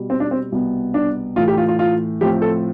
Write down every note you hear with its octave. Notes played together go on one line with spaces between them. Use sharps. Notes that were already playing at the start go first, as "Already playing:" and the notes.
Already playing: B2 G3
C4
D4
C4
C2 B2 B3
D4
A2 E3 A3 F4
G4
F4
F4
F4
A2 F3 C4 G4
A4